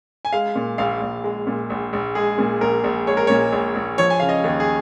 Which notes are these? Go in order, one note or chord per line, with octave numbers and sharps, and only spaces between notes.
G#5
G#3 F5
A#2
A#1 F5
A#1
G#3
A#2
A#1
A#1
G#3 G#4
A#2
A#1 A#4
A#1
G#3 C#5
A#4
A#2 C#5
A#1
A#1
F3 C#5
G#5
C#3 F5
D#5
D#2
G#4